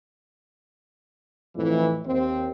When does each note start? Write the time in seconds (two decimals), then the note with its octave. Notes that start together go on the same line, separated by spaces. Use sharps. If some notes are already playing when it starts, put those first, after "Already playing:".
1.56 F2 A2 E3
2.06 D#2 C4